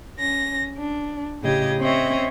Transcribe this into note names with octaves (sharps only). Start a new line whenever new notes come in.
C#4 A#6
D4
A2 C#3 G4 D#5 G#6
C4 C#4 C#5 D#5 E5